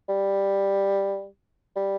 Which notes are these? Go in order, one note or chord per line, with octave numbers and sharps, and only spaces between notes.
G3
G3